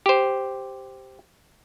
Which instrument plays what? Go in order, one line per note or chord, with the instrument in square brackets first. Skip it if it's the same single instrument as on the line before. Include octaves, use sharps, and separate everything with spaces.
[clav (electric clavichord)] G4 C5